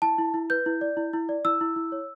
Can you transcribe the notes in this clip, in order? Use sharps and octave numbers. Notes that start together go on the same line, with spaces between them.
E4 A5
E4
E4
B4 G6
E4
D5
E4
E4
D5
E4 E6
E4
E4
C#5